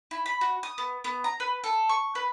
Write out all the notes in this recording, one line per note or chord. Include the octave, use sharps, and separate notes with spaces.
E4
B5
F#4
D#6
B3
B3
A#5
B4
A4
C#6
B4